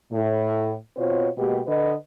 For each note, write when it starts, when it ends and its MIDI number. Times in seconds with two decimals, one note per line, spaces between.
0.12 0.74 45
0.97 1.29 47
0.97 1.29 60
0.97 1.29 65
0.97 1.29 72
0.97 1.29 73
1.37 1.61 47
1.37 1.61 56
1.37 1.61 58
1.37 1.61 67
1.67 1.95 50
1.67 1.95 71
1.67 1.95 75